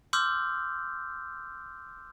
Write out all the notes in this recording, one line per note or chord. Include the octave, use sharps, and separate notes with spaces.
C6 D6 E6 F6 G6